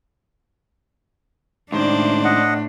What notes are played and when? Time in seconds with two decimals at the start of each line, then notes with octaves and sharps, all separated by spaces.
1.72 C#2 A2 D#3 D4 C5 D5
2.24 D#5 F#5